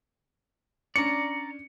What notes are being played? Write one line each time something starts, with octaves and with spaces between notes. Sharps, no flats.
C#4 D4 D5 A#5 C#7